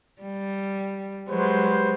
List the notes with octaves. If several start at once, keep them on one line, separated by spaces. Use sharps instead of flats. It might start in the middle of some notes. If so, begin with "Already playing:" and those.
G3
F#3 G#3 G4 B4 C5